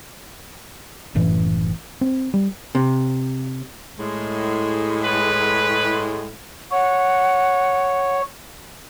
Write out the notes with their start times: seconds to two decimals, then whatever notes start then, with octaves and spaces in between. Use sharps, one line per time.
1.15 F#1 F#2 A2 E3
2.01 C4
2.34 G3
2.75 C3
3.98 A2 G#3
5.04 B4
6.72 C#5 F#5